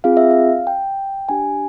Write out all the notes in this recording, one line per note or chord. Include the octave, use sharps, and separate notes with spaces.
C4 F4 G#4 F5
E5
F5
G5
D4 G4 G#5